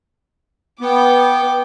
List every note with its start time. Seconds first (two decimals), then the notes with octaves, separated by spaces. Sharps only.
0.81 B3 G5 D6